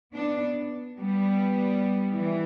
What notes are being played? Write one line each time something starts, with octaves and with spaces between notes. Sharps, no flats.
B3 D4
G3 B3
E3